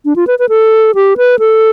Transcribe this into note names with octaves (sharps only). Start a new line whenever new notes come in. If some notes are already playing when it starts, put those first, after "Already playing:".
D4
F4
B4
B4
A4
G4
B4
A4